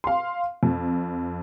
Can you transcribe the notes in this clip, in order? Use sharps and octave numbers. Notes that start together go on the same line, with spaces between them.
F5 C6
F2